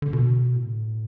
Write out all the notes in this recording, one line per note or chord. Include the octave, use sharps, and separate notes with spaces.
D3
B2
A2